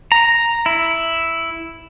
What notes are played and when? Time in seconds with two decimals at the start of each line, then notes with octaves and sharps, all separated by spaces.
0.12 A#5
0.66 E4